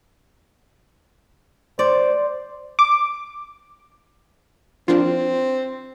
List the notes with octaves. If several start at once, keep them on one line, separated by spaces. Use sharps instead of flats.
C5 D5
D6
F3 A#3 C4 D4 F4